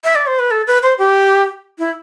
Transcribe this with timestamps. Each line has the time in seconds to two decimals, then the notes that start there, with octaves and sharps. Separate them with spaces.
0.04 E5
0.15 D5
0.27 C5
0.39 B4
0.51 A4
0.67 B4
0.83 C5
0.99 G4
1.79 E4